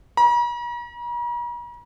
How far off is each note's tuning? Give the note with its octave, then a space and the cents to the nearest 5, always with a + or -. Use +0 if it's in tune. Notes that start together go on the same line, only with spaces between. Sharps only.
A#5 +45